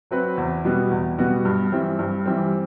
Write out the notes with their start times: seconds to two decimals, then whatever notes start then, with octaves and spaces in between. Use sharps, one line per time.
0.11 F#3 C4 F#4 B4
0.38 E2
0.64 B2 G3 B3 F#4
0.91 E2
1.18 B2 G3 B3 F#4
1.45 G2
1.72 E3 G3 C4
1.99 G2
2.26 E3 G3 C4